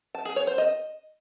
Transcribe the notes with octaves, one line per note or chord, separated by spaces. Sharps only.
A5
G#4
C#5
C5
D#5